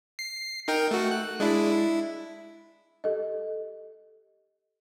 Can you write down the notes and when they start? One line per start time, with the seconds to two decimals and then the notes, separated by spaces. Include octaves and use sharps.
0.19 C7
0.68 D#4 A#4 G5
0.91 A3 F#4
1.11 F#6
1.40 G#3 D4 E4
1.72 E4
3.04 G4 A4 D#5